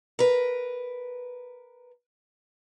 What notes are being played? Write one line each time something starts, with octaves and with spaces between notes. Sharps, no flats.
A#4 B4